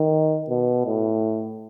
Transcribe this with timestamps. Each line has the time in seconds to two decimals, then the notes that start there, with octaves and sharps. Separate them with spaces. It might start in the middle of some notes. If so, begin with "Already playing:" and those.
Already playing: D#3
0.50 B2
0.86 A2